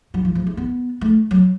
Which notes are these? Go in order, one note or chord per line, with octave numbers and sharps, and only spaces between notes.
F#3
F3
F3
A3
B3
A3
F#3